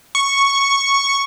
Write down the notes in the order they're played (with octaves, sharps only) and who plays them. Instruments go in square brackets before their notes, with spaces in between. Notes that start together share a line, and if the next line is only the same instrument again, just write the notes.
[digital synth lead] C#6